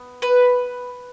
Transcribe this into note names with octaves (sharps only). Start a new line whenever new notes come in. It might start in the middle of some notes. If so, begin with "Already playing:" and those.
Already playing: B3
B4